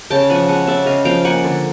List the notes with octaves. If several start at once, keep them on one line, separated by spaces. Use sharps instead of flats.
C#3 G5 A5
F3 F#5 G#5
G#3 F#5 G#5
C#3 D5 E5
C#3 D#5 F5
F3 F5 G5
A#3 F#5 G#5
D3